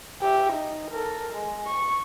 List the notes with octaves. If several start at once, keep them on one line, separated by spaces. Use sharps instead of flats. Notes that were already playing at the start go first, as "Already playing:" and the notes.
G4 E5
D#4
A4 A#4
G#3
C#6